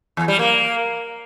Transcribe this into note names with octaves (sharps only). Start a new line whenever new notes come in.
E2
G3
A#3